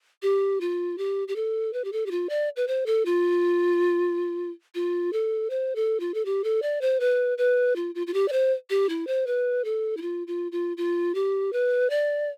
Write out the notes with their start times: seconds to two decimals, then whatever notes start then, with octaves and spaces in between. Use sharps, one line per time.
0.22 G4
0.61 F4
0.98 G4
1.28 G4
1.36 A4
1.73 B4
1.84 G4
1.92 A4
2.06 G4
2.11 F4
2.29 D5
2.56 B4
2.67 C5
2.86 A4
3.05 F4
4.75 F4
5.13 A4
5.50 C5
5.75 A4
6.00 F4
6.14 A4
6.25 G4
6.44 A4
6.62 D5
6.81 C5
7.00 B4
7.38 B4
7.76 F4
7.95 F4
8.07 F4
8.14 G4
8.28 D5
8.32 C5
8.70 G4
8.89 E4
9.07 C5
9.27 B4
9.65 A4
9.97 E4
10.02 F4
10.27 F4
10.52 F4
10.77 F4
11.15 G4
11.53 B4
11.90 D5